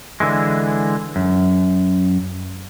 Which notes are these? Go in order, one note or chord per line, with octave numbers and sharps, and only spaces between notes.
D3 E3 G#3
F#2